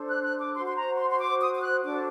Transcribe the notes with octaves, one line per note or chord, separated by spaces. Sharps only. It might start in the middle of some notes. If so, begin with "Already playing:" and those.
Already playing: D4 A4 C5
F#6
F#6
D6
F#4 C5 C6
C6
A#5
C6
C6
D6
D#6
D#6
F#6
D4 F#4 A4 C5 D6